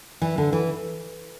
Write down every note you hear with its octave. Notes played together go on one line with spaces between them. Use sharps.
E3
D3
E3